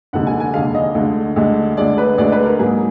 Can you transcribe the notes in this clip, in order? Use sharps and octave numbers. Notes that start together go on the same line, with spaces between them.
F1 D#2 D3 G#3 F#5
G#5
G#5
F1 D#2 D3 G#3 F5
D#5
D2 D3 G#3
D2 D3 G#3
D2 D3 G#3 D5
B4
D2 D3 G#3 D5
B4
A#4
G#2 F#3 A#3 G#4